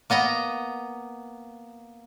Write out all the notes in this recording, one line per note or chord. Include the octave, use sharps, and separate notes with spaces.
A#3 B3 D#5 A#5